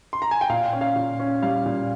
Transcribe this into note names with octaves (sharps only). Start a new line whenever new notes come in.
C6
A#5
G#5
G5
A#2 F5
C#4
F5
A#2
C#4
G3 F5
A#2